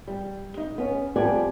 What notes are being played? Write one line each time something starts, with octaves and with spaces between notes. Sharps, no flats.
G3
D#4
B3 C#4
F2 G3 B3 G4 D5 G#5